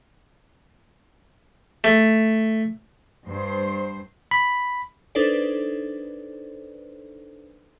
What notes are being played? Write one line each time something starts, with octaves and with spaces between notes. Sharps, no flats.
A3
G2 C5
B5
D4 D#4 A4 B4 C5 D5